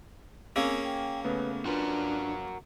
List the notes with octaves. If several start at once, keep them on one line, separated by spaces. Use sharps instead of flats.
A#3 C4 C#4 G#4 F5 G#5 E6
G5
C#3 A3 B3 B4
D4 F4 F#4 A#4 B4